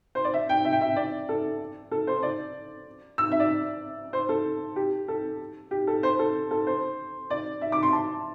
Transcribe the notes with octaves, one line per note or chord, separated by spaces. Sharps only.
C5
D5
E5
G5
E5
G5
E5
D5
A4
A4
C5
D5
E6
E5
D5
C5
A4
G4
A4
G4
A4
C5
A4
A4
C5
D5
E5
D6
C6
A5